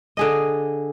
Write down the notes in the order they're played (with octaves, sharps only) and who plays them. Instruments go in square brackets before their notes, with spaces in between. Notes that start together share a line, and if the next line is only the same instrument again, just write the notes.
[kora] D3 G#4 D#5